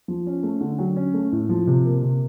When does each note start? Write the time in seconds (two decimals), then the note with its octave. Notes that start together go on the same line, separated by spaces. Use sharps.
0.08 F3
0.27 C#4
0.43 A3
0.61 D3
0.79 F#3
0.96 C#4
1.14 A3
1.32 A2
1.49 F3
1.67 C3
1.85 A#3
2.03 C3